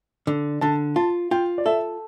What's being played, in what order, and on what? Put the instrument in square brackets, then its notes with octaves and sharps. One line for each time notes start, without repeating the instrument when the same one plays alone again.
[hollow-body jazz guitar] D3
[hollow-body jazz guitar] D3 [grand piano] A5
[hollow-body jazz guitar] F4 [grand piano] A5
[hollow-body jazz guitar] F4 [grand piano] G5
[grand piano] D5
[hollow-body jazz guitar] A4 [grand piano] E5